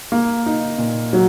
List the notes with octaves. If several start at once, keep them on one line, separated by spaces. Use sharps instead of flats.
A#3
D#4
A#2
F#3